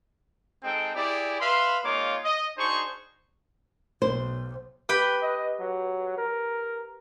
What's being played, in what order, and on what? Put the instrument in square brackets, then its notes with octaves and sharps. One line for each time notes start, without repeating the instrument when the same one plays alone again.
[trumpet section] G#3 C4 D#4 A4 G5
E4 G4 G#4 D5
B4 E5 F5 B5 C6
G#3 A#3 D#4 F4 C#5 D6
D#5
D4 D#4 F#4 G#4 C5 C#6
[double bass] B1 [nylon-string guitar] C5
[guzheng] G4 B4 G5
[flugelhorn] D#5
F#3
A#4